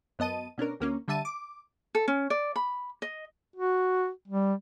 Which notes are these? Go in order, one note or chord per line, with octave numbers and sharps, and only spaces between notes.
F#2 B3 D#5 A5 D#7
B2 C#4 D4 A#4
D2 A#3 C#4
D3 G3 E5 A5 D#7
D6
A4
C#4
D5
B5
D#5
F#4
G3